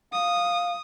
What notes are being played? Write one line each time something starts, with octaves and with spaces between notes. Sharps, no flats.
F5 D#6